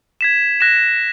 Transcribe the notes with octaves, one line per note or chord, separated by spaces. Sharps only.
G#6 B6 E7
F#6 A#6 E7